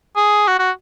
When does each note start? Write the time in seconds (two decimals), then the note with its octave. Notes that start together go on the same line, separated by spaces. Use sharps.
0.17 G#4
0.48 F#4
0.59 F#4